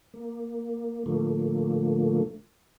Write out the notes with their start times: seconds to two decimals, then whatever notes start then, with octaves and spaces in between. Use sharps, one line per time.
0.14 A#3
1.06 A2 D3 F3 A3 A#3